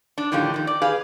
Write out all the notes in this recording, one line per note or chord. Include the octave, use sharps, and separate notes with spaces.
D4
A2 D3 D#3 F3 G4
A#2 D#3
D5
G4 G#4 B4 F5